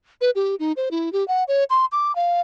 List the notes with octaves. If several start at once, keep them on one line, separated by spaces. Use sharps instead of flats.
B4
G4
D#4
C5
E4
G4
F#5
C#5
C6
D6
F5